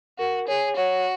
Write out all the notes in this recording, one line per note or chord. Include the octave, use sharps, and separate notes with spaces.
F#4 A#4
G#4 C#5
F#4 C#5